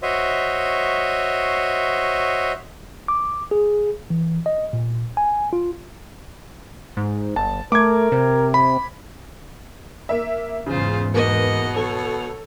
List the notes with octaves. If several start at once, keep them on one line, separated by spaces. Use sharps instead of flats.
F#4 C5 C#5 D#5 E5
D6
G#4
E3
D#5
A#2
G#5
F4
G#2
G1 A5
A3 A#4 D6 G#6
C3
B5
A#3 E5
E2 G#2 C#3 F4 C5
B2 A#3 B3 D#5 F#5
A4 C#5